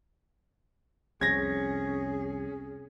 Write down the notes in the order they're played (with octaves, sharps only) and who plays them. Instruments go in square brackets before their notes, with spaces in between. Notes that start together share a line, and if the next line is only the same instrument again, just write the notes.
[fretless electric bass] C2 F2 [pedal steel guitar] C#4 [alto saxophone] G#4 [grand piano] G#6 A#6